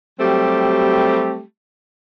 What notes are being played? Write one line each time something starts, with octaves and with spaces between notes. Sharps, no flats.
F#3 G3 A3 C4 G4